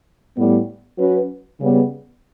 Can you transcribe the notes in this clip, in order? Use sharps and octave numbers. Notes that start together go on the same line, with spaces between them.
A2 G3 B3
F#3 C#4 F#4 B4
C#3 G3 B3